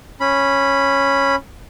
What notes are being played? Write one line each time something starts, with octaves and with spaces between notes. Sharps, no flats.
C#4 B5